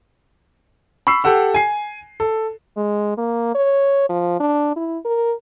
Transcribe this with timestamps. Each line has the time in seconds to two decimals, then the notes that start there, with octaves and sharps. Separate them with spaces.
1.07 B5 C#6 E6 C7
1.24 G4 A4 F#5 E6
1.54 G#5 C7
2.20 A4
2.77 G#3
3.17 A#3
3.55 C#5
4.09 F3
4.40 D4
4.76 E4
5.05 A#4